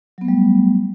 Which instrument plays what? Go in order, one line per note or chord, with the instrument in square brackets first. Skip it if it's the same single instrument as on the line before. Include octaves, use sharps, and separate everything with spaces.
[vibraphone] F#3
B3
A3
G3